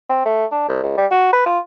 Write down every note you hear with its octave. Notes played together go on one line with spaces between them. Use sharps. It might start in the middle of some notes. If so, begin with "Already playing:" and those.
C4
A3
D4
C2
C#2
G3
F#4
B4
F4